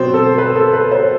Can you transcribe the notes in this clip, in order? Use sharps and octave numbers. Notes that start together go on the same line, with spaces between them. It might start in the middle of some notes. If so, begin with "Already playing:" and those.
Already playing: B2 F#3 C4 C5
A4
B4
A4
B4
C5